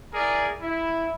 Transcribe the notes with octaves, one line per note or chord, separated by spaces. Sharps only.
E4 G#4 A#4 D5
E4